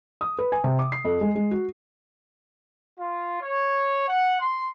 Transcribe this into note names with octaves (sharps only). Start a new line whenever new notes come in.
D#6
B4
G#5
C3
D6
C7
F2
G#3
G#3
F#4
F4
C#5
F#5
C6